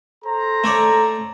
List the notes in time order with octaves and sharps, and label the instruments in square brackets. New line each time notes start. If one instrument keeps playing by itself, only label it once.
[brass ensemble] A4 C5 A#5
[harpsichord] A3 C#5 D5